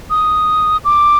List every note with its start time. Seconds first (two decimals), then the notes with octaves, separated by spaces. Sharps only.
0.10 D#6
0.85 D6